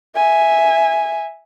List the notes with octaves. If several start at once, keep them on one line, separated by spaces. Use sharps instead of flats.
E5 G#5